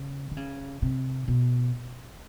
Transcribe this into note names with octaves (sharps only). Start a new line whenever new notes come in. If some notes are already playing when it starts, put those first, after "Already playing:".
Already playing: C#3
D3
C#3
C3
B2